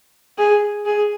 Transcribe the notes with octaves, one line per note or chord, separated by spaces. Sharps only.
G#4
G#4